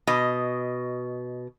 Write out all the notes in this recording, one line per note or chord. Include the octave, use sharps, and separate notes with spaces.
B2 D#5